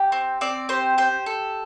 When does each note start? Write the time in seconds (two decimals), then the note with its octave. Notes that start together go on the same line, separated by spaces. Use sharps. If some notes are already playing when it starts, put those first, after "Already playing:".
Already playing: G4
0.12 C4
0.41 C4 D5
0.69 G4 C5
0.98 G4 C5
1.26 A4